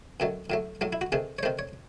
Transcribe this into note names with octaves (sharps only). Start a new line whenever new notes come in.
F#2 D#3 F#3 A3
A2 F#3 A3
A2 F#3 A3
E4
F#4
C3 D#3 A3 G#4
C#5
C3 D#3 A3 C5
C#5